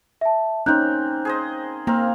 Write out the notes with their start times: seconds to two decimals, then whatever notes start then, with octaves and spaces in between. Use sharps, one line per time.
0.21 E5 A5
0.66 A#3 C4 C#4 D#4 F#6 G6
1.25 G#4 C5 D#5
1.87 A#3 C4 A#4 F5